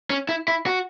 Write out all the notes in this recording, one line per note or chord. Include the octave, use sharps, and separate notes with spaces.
C#4
E4
E4
F#4